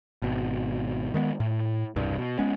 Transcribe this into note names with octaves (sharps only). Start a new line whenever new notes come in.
G#1 B2
D#3 G#3 A3 B3
A2
E1 C2 G2
B2
G#3 B3 C#4